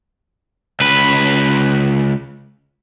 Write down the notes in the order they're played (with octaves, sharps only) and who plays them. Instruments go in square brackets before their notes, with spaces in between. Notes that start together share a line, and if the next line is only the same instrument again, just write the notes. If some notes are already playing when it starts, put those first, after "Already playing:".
[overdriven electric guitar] C#2 B4